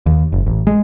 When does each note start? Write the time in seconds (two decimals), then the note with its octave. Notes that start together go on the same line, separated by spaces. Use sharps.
0.06 D#2
0.32 F#1
0.46 A1
0.67 G#3